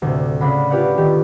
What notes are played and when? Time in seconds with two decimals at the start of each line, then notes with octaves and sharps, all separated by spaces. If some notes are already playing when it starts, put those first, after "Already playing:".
0.02 D2 A2 C3
0.41 C#3 D4 F#5 B5
0.70 F4 G4 B4 C#5 D5 F#5
0.97 D#3 G4